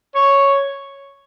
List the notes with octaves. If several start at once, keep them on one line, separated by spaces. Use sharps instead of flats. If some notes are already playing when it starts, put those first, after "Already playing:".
C#5